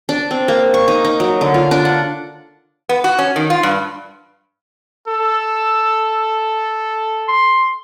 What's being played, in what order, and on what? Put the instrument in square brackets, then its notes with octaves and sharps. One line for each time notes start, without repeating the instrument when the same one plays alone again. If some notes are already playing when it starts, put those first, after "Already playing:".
[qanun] D4
C4
A#3
C#6
D#4
D#4
F#3
D3
F4
D4
F#5
[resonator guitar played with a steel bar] B3
F#4
C#4
D#3
F4
G2
[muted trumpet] A4 [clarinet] E6
[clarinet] C6